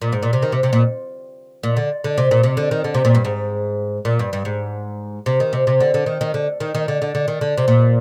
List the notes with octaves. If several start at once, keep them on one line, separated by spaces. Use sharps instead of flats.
A#2
G#2
A#2
C3
D#3
C3
C3
A#2
A#2
D3
D3
C3
A#2
C3
D3
D#3
D3
C3
A#2
G2
G#2
A#2
G2
G2
G#2
C3
D#3
C3
C3
D3
D3
D#3
D#3
D3
D#3
D#3
D3
D3
D3
D#3
D3
C3
A#2